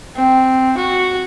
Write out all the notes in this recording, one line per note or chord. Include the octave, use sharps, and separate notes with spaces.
C4
F#4